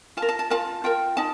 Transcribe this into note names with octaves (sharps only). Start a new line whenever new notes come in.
F4 A5
A#4
A5
A5
F4 A#4 A5
F4 A#4 G5
D#4 A5